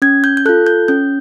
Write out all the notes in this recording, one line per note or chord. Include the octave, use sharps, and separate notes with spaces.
C#4 G#6
G6
G6
F4 A4 F#6
G6
C#4 G6